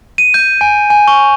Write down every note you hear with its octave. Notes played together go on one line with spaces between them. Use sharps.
D#7
G6
G#5
G#5
C#6